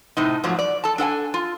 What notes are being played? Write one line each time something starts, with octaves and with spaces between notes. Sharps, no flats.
A2 C3 D#4
G#2 F3 F#3 A3
D5
A4 A5
D4 A4 F#5 G#5
F4